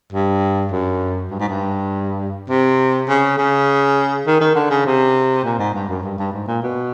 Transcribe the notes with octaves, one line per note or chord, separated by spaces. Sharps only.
G2
F#2
G2
G#2
G2
C3
C#3
C#3
D#3
D#3
D3
C#3
C3
A#2
G#2
G2
F#2
G2
G2
G#2
A#2
B2